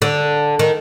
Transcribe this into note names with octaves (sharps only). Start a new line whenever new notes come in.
D3
D#3